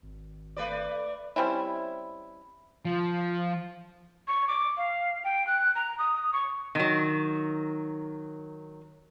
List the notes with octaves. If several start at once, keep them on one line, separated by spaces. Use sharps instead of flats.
G#1
A3 B4 D5
G3 C4 C#4 E4
F3
C#6
D6
F5
G5
F#6
A#5
D#6
C#6
D#3 F#3